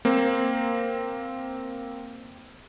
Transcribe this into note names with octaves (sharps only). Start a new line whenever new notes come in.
A#3 C4